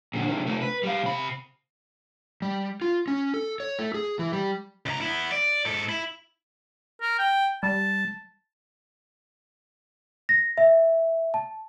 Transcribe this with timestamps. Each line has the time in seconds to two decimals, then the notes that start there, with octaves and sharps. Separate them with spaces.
0.14 A#2 D3
0.27 C3 D#3
0.47 C3 A3
0.62 B4
0.83 G3 F5
1.03 C3 B5
2.42 G3
2.82 F4
3.08 C#4
3.34 A4
3.60 C#5
3.79 A3
3.94 G#4
4.19 E3
4.32 G3
4.86 C#2 A#5
5.01 B3 E4
5.32 D5
5.65 G#2 A4
5.89 E4
7.01 A#4
7.19 G5
7.63 G3 A5
10.29 A#6
10.58 E5
11.34 A5